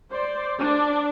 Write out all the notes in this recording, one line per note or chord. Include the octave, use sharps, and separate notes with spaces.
C5 D5
D4 D5